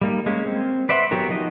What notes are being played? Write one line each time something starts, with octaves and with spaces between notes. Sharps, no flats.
G3 A#3 D#4
G#3 A#3 C#4
C4
B4 D5 E5 F#5 C6
F#3 B3 F#4 G4 A#4
F3 D#4 F#4 D#5